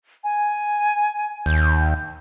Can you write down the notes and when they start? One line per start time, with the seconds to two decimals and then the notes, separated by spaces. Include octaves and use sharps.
0.24 G#5
1.46 D#2 G6